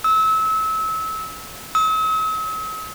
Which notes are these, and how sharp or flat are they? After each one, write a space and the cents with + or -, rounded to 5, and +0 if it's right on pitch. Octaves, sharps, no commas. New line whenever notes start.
E6 -30
E6 -45